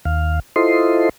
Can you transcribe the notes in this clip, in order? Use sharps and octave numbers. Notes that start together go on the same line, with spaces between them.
D#2 F5
E4 F4 A4 C5 D#5 C6